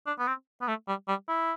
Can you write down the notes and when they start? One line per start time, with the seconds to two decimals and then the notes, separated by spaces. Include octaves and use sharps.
0.07 D4
0.19 B3
0.27 C4
0.61 B3
0.68 A3
0.88 G3
1.08 G3
1.28 E4